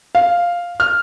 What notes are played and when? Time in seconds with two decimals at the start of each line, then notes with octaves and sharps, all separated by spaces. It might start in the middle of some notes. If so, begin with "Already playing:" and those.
0.15 F5
0.80 F6